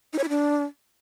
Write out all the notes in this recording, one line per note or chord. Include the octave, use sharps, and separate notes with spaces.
D#4
C#5
E4
D4